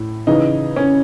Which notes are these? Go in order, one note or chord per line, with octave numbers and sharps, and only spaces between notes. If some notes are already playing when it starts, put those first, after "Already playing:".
Already playing: A2
C#3 E3 D#4
C#4